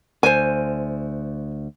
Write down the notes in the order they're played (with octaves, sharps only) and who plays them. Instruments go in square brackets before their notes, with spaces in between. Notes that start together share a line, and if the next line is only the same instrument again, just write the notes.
[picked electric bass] D2 [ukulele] C5 G#5